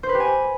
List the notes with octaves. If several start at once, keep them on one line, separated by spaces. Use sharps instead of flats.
C5
B4
G4
G#5